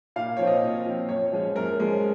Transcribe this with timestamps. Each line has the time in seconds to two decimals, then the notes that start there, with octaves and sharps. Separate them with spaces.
0.16 A#2 F5
0.37 F3 C4 C#5
0.47 D#5
0.63 A#2
0.86 F3 C4
1.09 F#2 C#5
1.33 F3 G#3 C#4
1.56 F#2 A#4
1.80 F3 G#3 C#4